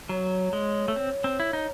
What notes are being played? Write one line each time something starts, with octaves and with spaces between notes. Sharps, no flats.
F#3 C#5
G#3
A3
C4
C4
E4
D#4